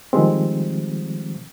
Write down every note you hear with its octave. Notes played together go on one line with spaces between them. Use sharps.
D#3 F3 G3 G#3 C4